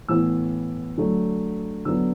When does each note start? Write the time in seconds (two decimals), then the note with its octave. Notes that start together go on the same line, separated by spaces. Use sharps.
0.08 A2 E3 B3 E6
0.97 D3 F#3 A3
1.85 D3 F#3 B3 E6